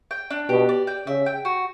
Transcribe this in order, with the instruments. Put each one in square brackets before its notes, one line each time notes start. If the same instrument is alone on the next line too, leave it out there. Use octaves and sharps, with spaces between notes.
[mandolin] G5
D4
[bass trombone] B2 [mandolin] G4
[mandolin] D5
G5
[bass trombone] C#3 [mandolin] E5
[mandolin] G5
F#4